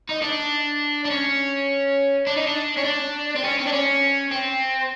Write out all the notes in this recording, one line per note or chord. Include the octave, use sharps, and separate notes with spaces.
D#4
D4
D4
C#4
D4
D#4
D4
C#4
D4
C4
C#4
C4
D4
C#4
C4